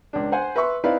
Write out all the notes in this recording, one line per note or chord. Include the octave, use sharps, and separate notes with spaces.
C#2 D4
C5 F#5 G#5
B4 E5 C6 C#6
C4 D#4 E4 B4 D5 F5